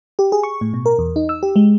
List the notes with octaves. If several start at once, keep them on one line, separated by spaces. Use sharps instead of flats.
G4
G#4
C#6
A2
B2
A#4
E2
D#4
E6
G4
G#3